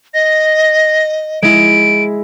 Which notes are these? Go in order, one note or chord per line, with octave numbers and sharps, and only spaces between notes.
D#5 A#6
G#3 E4 D7